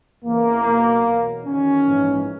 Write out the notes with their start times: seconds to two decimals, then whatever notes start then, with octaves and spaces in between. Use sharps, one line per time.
0.24 E2 C#3 E3 A#3
0.65 B1 B2 F#3
1.05 E2 B2 F#3
1.45 E2 D#3 F#3 C#4
1.86 A#1 G#2 E3